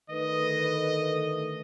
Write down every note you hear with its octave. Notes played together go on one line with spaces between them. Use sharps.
D3 D#3 A3 B4 D#5